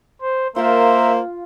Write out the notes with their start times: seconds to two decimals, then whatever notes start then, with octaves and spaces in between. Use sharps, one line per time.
0.22 C5
0.56 A#3 F4 A#4 C5 E5